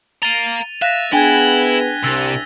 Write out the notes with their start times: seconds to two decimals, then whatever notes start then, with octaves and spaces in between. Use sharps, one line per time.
0.23 F5 A#5 A6 D#7 F7 G7
0.82 E5 F5 F#6 A#6 B6
1.13 B3 D4 E4 G#4 G5 G#5 G#6 G7
2.04 C2 C3 E6 A6